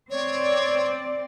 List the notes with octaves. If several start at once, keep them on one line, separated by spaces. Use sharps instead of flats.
C4 C#5 D5